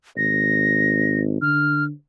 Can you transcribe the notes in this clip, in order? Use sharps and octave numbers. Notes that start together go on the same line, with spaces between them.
G#1 A#6
D3 F6